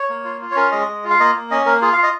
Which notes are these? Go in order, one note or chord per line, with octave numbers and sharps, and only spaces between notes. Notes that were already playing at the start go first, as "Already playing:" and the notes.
Already playing: C#5
A#3
F4
F4
C#5
C#4 A#4
G#3 D#5
G#3
F4
F5
A#3 D#5
A#3
C#4 D#5
A#3 A#4
F4 G#4
F5
F4
D#5